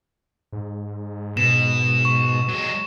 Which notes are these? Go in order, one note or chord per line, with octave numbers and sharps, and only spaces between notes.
G#2
B2 E7
C#6
F#3 G#3